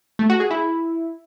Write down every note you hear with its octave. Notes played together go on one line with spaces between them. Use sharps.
A3
F#4
G#4
E4